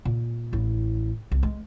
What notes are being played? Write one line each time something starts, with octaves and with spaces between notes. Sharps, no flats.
A#2
A1 E4
C2
G#3